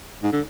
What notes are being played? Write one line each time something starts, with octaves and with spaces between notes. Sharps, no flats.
G#2
D3